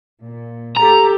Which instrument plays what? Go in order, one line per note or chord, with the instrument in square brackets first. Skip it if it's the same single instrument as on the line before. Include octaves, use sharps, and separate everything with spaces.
[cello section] A#2
[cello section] G4 A4 [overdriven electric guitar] A#5